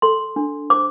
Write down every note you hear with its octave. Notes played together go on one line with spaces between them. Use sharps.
A4 C6
D4
C5 D6